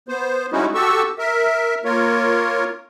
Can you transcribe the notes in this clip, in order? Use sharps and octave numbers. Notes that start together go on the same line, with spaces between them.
B3 C5
G3 G#3 C#4 D#4 E4 F#4
F#4 G4 A4 C#6 E6
A#4 E5
A#3 F4 A#4 C#5